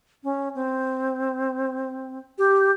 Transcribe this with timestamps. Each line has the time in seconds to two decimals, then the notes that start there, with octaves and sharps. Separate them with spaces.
0.24 C#4
0.55 C4
2.38 G4